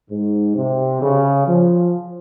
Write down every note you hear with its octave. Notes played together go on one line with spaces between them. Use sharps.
G#2
C3
C#3
F3